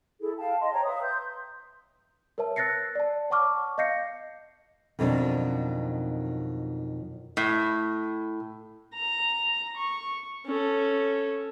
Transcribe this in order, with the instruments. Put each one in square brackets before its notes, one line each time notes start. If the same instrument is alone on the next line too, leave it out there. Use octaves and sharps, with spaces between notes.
[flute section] E4 G#4 A4
F5 G5 A5
D#5 C6
C5 C#5 G5 A#5
B4 E5 F5 D#6
C6 G6
[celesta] A#4 B4 C#5 E5 A5
E6 F#6 A6 A#6 C7 C#7
D5 A5
C#5 F#5 A5 C#6 D6 F6
D#5 F5 G6 A#6 C7 C#7
[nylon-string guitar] F2 B2 D#3 F#3 C4 D4
[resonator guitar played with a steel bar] A2
[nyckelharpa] A#5
C#6
C#4 A4